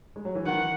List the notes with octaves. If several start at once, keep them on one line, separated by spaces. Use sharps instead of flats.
G#3
F#3
E3
D#3 F#5